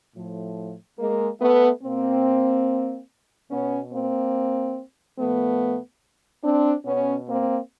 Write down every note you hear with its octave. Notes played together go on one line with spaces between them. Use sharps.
A2 F3
G#3 A#3
A3 B3
B2 A#3 C4
B2 B3 C#4
A#3 C4
A#2 F3 A3 B3
C4 D4
B2 B3 C#4
A#3 C4